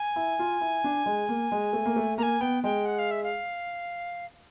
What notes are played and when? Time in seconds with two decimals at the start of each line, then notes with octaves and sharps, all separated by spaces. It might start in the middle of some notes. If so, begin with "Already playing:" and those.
Already playing: G#5
0.16 E4
0.39 F4
0.61 E4
0.84 D4
1.06 G#3
1.29 A#3
1.52 G#3
1.73 A3
1.86 A#3
1.96 A3
2.18 A#3 A#5
2.23 G#5
2.40 B3 G5
2.64 G#3 G5
2.85 F#5
2.99 F5
3.11 E5
3.23 F5